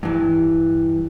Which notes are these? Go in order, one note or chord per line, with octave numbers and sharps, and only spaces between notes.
G2 E3